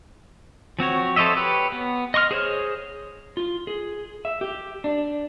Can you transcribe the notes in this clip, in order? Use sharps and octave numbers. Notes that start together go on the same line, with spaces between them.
F3 C4 F#4 C#5
A4 C5 C#5 D#5 E5
G4 B4 C#5
B3
D#5 C6 C#6 F6
G#4 C5 C#5
F4
G#4
E5
G4
D4